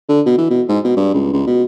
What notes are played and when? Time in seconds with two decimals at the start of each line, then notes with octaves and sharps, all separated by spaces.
0.09 D3
0.26 B2
0.38 E3
0.50 B2
0.69 G#2
0.84 B2
0.97 G2
1.14 C#2
1.33 C#2
1.47 B2